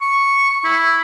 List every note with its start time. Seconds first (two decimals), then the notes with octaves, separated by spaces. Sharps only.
0.01 C#6
0.64 E4